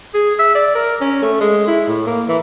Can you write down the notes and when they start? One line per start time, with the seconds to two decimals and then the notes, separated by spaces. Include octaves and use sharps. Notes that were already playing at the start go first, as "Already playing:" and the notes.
0.14 G#4
0.39 E5
0.55 D5
0.75 A#4
1.01 C#4
1.22 A3
1.41 G#3
1.67 E4
1.88 A2
2.07 A#3
2.28 E3